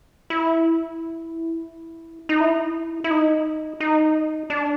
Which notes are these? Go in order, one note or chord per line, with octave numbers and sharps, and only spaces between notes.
E4
D#4
E4
E4
D#4
D#4
D4